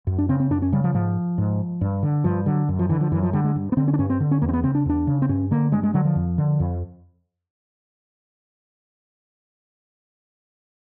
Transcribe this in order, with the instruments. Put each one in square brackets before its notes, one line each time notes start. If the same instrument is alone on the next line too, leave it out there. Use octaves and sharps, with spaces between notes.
[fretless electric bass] F#2
D4
C#3 C4
C4
F#2 D4
C#4
C#3 G3
F3
G#2 F3
G#2
G2
D3
G2 F3
D3 F#3
F#2
F3
D3 E3
F3
F#2 E3
F3
D3 G3
G#3
G2
B3
D3 C4
C#4
D4
G2 C#4
C4
D3
C#4
E2 A#3
C4
B3
C#3 C4
D4
E2 D4
C#3
C4
G2 C#4
D3 A#3
G2 G#3
G#3
D3 F#3
F3
F2
D3
F2